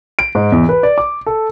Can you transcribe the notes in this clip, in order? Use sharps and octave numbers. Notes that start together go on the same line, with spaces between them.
D7
G#2
E2
B4
D5
D6
A4